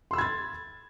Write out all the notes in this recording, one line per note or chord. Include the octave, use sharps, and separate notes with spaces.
B5 C6 E6 G#6 A6